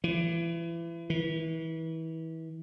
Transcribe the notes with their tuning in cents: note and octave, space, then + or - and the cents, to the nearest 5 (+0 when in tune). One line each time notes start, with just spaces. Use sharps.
E3 +30
E3 -30